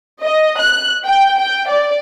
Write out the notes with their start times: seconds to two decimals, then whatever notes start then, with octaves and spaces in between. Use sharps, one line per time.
0.23 D#5
0.58 F#6
1.05 G5
1.37 G5
1.68 D5